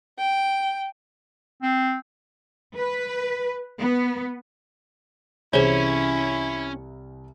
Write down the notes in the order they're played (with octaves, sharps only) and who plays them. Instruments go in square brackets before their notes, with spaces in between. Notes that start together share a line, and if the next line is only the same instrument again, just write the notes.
[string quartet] G5
[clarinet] C4
[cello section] B4
B3
[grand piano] C2 E3 [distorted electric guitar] C#4 [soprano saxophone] E4 [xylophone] G#4 C5 C#5